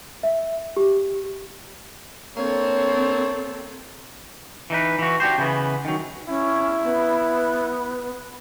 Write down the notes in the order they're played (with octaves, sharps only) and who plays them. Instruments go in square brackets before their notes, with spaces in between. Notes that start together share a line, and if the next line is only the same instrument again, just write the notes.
[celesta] E5
G4
[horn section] A#3 D4 C#5 [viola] C4 A4
[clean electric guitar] E3 D#4 B4
E3 F#4
D4 F#4 G4 C5
C#3 E3 B3
D#3 F#3
[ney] C#4 [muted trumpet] E4
[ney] B3